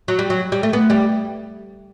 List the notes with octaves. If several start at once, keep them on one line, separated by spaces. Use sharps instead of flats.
F#3
G3
F#3
G3
A3
B3
G3